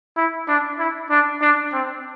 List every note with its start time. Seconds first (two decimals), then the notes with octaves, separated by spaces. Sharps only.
0.17 E4
0.48 D4
0.79 E4
1.10 D4
1.42 D4
1.73 C4